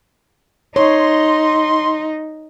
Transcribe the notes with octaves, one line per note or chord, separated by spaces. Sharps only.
D#4 C#5 C6